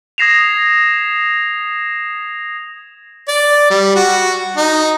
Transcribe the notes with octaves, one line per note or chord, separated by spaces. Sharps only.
D#6 G#6 A#6 C7 E7 F7
D5
G3
F#4
D#4